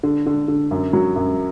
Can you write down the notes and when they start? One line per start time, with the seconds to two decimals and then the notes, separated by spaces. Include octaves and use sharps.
0.03 D3
0.26 D3
0.48 D3
0.71 F#2
0.93 F#3
1.16 F#2